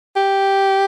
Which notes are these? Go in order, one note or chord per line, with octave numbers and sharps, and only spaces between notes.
G4